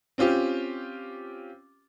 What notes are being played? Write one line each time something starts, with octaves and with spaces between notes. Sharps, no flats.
C4 C#4 F4 G4